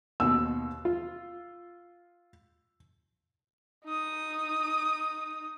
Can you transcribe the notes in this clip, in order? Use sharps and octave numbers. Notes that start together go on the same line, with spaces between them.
D#2 B2 E6
F4
D#4 D#6